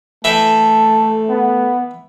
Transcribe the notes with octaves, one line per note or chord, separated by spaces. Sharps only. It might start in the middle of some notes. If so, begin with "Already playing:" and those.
E3 A3 A4 E5 G5
B3